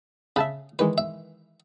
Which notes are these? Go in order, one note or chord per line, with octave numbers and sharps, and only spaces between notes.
C#3 E5 A5 B5
D#3 E3 G#3 B4
E5